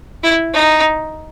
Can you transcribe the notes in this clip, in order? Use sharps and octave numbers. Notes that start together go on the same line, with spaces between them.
E4
D#4